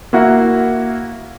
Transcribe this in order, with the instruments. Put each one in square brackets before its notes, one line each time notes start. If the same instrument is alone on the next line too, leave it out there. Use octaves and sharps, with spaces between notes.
[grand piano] A#3 E4 F#4